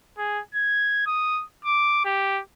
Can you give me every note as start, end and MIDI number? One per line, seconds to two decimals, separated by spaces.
0.18 0.40 68
0.55 1.02 92
1.07 1.44 87
1.65 2.01 86
2.05 2.41 67